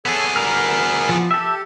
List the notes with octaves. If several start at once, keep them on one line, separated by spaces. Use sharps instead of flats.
B3 G#4 A4 C#5 A5
D2 G3 A#4 A#5 F6
F3
G4 A4 E5